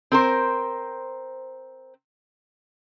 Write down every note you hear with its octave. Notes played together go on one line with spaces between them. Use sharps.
C4 A#4 C5